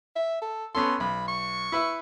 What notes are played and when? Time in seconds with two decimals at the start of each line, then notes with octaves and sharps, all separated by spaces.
0.16 E5
0.42 A4
0.75 B3 C#4 A4 C6
1.00 B1 B5
1.28 C#6
1.72 E4 B4 E5